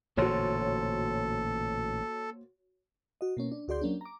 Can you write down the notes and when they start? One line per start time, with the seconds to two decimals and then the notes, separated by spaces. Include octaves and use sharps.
0.17 A1 A#2 D3 A#3 F#4 A4 C5 C#5
3.21 F#4 D#5
3.37 B2 A#3 C#4
3.52 D4
3.68 D2 F#4 G#4 D5 C6 G6
3.82 F#3 A#3 C#4 D4
4.01 A#5 D6